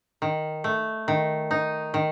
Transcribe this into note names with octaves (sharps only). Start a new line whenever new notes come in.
D#3
A3
D#3
D#4
D#3